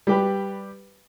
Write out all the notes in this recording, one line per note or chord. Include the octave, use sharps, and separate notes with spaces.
G3 G4 B4